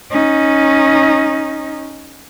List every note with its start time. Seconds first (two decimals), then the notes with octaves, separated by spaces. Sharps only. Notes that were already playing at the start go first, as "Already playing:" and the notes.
0.11 C#4 D#4